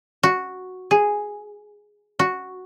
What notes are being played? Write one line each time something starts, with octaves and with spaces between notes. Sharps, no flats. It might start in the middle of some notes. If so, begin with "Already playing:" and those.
F#4
G#4
F#4